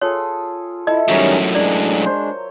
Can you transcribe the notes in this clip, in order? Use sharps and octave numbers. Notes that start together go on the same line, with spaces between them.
F4 G#4 A4 C#5
E4 A4 D#5 E5
F#2 A2 D#3 F#3 G3 C#4 A#4 C#5
G#3 D4 D5
C5 C#5